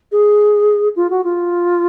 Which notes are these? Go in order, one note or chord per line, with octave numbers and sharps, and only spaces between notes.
G#4
F4
F#4
F4